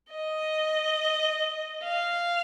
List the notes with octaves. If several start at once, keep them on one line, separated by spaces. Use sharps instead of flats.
D#5
F5